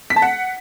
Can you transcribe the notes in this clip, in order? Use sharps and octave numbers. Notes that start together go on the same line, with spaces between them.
B6
A5
F#5